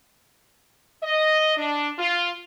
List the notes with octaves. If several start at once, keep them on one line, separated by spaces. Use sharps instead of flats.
D#5
D4
F4